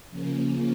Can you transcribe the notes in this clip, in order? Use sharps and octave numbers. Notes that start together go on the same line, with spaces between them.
C#3 F3 A#3 C#4